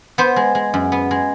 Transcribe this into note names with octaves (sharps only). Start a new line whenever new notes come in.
B3 C5
G#3
G#3
F#2
B3
G#3